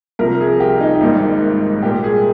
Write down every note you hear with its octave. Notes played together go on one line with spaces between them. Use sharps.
C2 C3 F3 A#4
G#4
G4
D#4
G#1 G#2 G3 A#3
C2 A#2 G3 A#3 G4
G#4